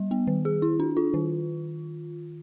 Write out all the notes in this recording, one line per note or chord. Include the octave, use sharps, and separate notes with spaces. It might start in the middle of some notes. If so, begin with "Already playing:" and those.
Already playing: G3
B3
D#3
G#4
E4
D4
F4
D#3